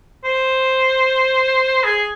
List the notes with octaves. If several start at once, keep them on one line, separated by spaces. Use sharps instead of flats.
C5
G#4